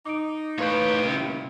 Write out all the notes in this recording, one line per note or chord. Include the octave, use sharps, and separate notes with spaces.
D#4 D6 D#6 D7
A2 G4 B4 C#5 F5 C6 G6
G2 A#2 C#3 C4 E4